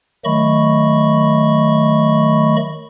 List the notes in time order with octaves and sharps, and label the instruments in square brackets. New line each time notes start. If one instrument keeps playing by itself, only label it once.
[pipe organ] D#3 F#3 A3 D#5 B5 C#6